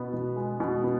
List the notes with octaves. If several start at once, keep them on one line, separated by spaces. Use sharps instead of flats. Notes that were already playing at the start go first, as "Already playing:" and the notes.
Already playing: B2 B3
B2
G#3
B2
B3